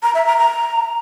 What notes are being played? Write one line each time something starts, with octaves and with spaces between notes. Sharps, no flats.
A#5
E5
A#5
A#5